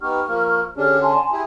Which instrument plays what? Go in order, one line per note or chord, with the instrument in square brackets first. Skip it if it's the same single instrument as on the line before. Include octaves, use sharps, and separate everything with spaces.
[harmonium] B3 D#4 G4 [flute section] C#6 F6
[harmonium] F3 A#3
[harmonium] D3 C#4 D4 [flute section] G4 G#4 F6
[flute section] G#5 A5 C6
[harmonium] E4 G4 G#4